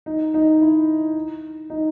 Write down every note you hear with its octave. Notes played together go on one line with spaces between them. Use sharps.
D#4
D#4
E4
D#4